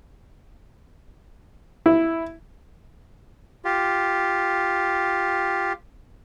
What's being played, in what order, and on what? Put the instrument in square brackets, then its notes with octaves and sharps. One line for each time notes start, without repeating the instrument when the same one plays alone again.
[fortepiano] E4
[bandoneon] F4 G4